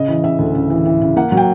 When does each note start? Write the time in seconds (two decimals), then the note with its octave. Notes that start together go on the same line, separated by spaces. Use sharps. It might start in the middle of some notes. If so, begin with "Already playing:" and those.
Already playing: C#3 D#5
0.08 E3
0.24 C#3 E5
0.39 D2
0.55 C#3
0.70 E3
0.86 E3
1.01 C#3
1.16 A#3 F#5
1.32 F#3
1.37 G5